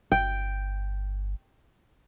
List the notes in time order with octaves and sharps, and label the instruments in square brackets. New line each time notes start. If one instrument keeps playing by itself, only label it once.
[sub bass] G1 [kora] G5